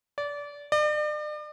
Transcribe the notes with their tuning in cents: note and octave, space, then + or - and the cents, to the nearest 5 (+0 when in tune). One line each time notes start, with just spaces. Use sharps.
D5 -25
D5 +40